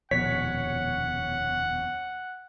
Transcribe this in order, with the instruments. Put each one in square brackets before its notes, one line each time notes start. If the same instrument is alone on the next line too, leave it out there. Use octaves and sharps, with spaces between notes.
[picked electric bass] D#1 F2 B2 [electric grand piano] C#5 [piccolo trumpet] F#5 [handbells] B6